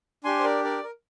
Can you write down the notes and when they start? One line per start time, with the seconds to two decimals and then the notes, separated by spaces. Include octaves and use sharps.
0.24 D4 G4 G#5 C6
0.39 C5
0.44 A#4 D5
0.64 A#4 D5
0.83 A#4